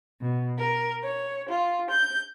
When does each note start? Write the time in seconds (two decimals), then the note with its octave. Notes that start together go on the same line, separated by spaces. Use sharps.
0.22 B2
0.58 A#4
1.03 C#5
1.48 F4
1.89 G6